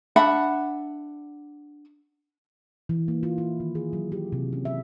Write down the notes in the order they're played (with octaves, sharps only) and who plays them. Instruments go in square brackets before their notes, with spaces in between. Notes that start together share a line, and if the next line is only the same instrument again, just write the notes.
[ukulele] D4 E5 F#5 B5
[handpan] E3
A#3
F4
E4
D#3
G#4
F#3
G4
C3
C#4
E5